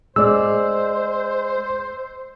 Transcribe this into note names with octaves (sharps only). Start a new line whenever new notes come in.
G#3 C5 D5 E6